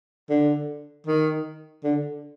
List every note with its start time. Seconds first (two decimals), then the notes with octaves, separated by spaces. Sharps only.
0.30 D3
1.06 D#3
1.84 D3